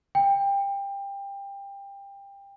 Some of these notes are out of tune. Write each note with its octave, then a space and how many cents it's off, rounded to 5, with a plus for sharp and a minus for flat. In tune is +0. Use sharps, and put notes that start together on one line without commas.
G5 +20